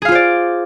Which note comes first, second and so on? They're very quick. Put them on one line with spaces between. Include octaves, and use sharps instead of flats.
G#4 F5 F4 C5 D5